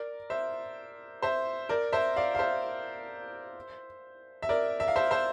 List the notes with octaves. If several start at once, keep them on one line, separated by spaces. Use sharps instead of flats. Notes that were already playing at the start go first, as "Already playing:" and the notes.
Already playing: A#4 D5
C5 E5
C5 E5
A#4 D5
C5 E5
D5 F5
F5
C5 E5
E5
A#4 D5
E5
F5
C5 E5
C5 E5